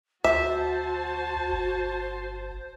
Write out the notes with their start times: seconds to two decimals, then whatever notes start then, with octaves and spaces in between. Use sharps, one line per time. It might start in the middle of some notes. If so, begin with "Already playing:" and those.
0.24 D2 F#4 C5 E5 A5
1.51 G1